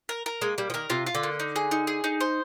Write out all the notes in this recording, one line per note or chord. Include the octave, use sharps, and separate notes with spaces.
A#4
A#4
G#3 A#3
G3 A#3
F3
D#3 A#4
C3 F4
F4
D3
A#3
D#4
G#4
D#4
G#4
D#4
C5